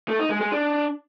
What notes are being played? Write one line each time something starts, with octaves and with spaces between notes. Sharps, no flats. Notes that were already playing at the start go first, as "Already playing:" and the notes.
A3
D#4
G#3
G#3
D4